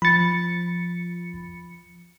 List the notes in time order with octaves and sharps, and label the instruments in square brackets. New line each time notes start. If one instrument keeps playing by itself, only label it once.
[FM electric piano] F3 C#7 [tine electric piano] B5 A6